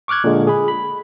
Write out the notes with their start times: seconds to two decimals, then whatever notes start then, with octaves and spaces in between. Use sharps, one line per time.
0.08 C#6 D6 F6 F#6 G#6
0.24 A#2 D3 G#3
0.47 G#4 B5
0.68 B5